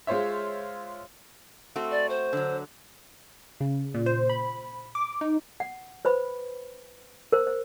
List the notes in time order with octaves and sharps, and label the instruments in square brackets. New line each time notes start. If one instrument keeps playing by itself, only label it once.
[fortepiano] G#3 F4 C5 C#5 E5
[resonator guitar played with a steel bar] A3 C4 F#4
[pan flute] D5
C5
[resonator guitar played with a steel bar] D3 F#3
[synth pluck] C#3
A#2
C5
B5
D6
D#4
[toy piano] F#5
B4 C5 B5
A#4 C5
C5